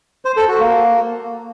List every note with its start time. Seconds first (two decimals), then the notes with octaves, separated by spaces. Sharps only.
0.25 C5
0.37 A4
0.48 F#4
0.60 A#3